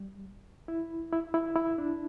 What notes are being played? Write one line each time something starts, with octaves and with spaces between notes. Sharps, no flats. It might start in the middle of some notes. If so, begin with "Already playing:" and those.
Already playing: G3
E4
E4
E4
E4
D4